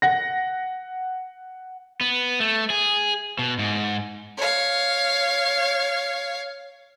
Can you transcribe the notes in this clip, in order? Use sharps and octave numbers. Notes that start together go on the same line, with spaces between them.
F#5 A#6
B3
A3
G#4
B2
G#2
C#5 F5